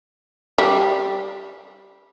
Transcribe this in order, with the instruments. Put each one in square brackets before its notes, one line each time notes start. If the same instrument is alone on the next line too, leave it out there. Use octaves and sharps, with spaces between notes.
[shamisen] G3